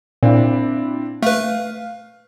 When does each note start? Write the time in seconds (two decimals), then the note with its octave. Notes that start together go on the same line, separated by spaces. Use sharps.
0.23 A#2 C4 D4 E4
1.23 A3 B4 F5